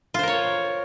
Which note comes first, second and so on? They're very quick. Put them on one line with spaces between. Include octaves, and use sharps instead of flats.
F4 C5 A#4 C#5